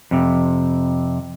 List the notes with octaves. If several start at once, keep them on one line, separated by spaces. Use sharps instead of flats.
F2 C3